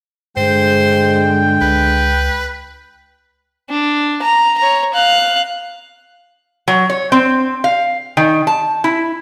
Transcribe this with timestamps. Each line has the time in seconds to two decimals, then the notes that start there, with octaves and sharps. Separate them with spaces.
0.37 G2 D3 G#3 C5 G5
1.61 C#2 B4
3.70 D4
4.22 A#5
4.58 C#5 A#5
4.93 F5 F#6
6.68 F#3
6.90 C#5
7.12 C4
7.64 F5
8.17 D#3
8.47 A5
8.84 E4